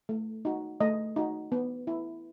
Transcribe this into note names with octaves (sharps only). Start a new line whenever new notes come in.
A3
D#4 F#4
A3 D#5
D#4 F#4
B3
E4